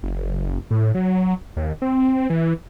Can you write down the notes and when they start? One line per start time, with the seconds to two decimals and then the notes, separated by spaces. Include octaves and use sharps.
0.03 F#1
0.71 A2
0.95 F#3
1.57 D#2
1.82 C4
2.30 E3